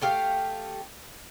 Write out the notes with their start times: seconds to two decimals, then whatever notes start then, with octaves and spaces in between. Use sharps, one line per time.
0.01 A3 G4 F5